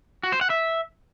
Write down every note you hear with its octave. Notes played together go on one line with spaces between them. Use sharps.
F#4
C5
F#5
E5